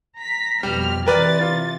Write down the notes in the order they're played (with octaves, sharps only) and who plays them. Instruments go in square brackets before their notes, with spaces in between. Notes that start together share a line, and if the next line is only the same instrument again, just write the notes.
[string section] A#5 B6
[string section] F2 B2 F6 [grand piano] G3
[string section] C3 E3 A6 [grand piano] A#4 B4 D5
[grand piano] F4